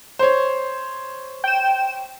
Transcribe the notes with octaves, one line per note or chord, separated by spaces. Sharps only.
C5 C#5
G5 E7